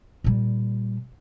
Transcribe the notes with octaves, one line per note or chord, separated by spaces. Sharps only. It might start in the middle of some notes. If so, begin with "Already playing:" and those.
A#2 G3